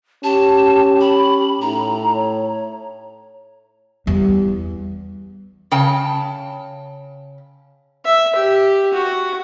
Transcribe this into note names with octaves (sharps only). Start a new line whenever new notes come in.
C#4 G4 A5
B5
A2 D#4 A#5
C#5
E2 G3
C#3 G5 A5
E5
G4
F#4